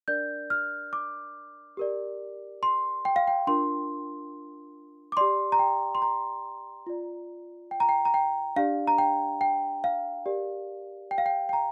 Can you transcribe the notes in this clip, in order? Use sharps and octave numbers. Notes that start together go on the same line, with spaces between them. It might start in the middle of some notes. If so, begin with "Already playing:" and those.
D4 A#4 D5 G6
F6
D6
G4 A#4 D5
C6
G5
F5
G5
D4 F4 A#4 C6
D6
G4 D5 C6
A#5
G5
C6
A#5
F4 D5
G5
A#5
G5
A#5
G5
D4 G4 D5 F5
A#5
G5
G5
F5
G4 A#4 D5
G5
F5
G5
G5
A#5